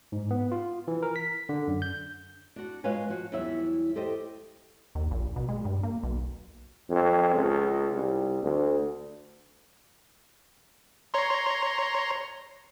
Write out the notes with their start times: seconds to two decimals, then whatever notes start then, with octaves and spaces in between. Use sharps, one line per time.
0.12 G#2
0.31 B3
0.52 F4
0.88 E3
1.03 A#4
1.16 B6
1.49 D3
1.68 F#2
1.82 G6
2.56 D4 F#4
2.84 G#3 F4 B4 C#5 F5 G#5
3.08 F3 F#4
3.32 E2 F#3 G3 E4 C#5 E5
3.96 G4 A4 C5 D#5 G5
4.95 D#2
5.11 A#1
5.36 B2
5.49 G#3
5.65 G2
5.83 A#3
6.03 B1
6.89 F2
7.34 C#2
7.93 C2
8.43 D2
11.14 C#5 A#5 C6